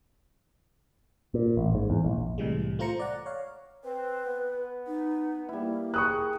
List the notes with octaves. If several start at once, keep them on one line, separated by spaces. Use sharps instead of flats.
A#2
A1
G#2
E2
A#1
C2 A2 C3 E3 G3 G#3
A3 F4 C5 A#5 C#7
D5 F#5 A#5
C#5 F5
C4 B4
B3
D#4
G3 A#3 E4
G#4 A#4 G5 C#6 D#6 F#6